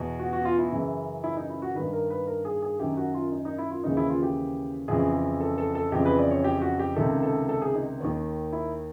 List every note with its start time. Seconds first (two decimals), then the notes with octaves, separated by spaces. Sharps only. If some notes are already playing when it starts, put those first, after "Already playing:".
Already playing: E2 B2
0.19 F#4
0.33 F#4
0.45 F4
0.59 E4
0.71 F#2 C#3 E3
1.24 E4
1.37 D#4
1.50 E4
1.62 F#4
1.75 G2 D#3 B4
1.93 A#4
2.10 B4
2.27 A#4
2.45 G#4
2.62 G#4
2.79 F#2 D#3 G4
2.97 F#4
3.14 F4
3.32 D#4
3.45 D#4
3.58 E4
3.71 F4
3.84 D#2 C#3 E3 D#4
3.97 E4
4.10 F4
4.23 G4
4.88 F2 C#3 E3 G#4
5.40 A4
5.58 A4
5.75 A4
5.92 F2 C#3 E3 G4
6.05 B4
6.18 D5
6.31 C#5
6.44 G4
6.62 F#4
6.79 G4
6.96 C#2 C3 D#3 A4
7.23 A4
7.49 A4
7.62 G#4
7.75 D#4
8.01 D#2 D#3
8.53 E4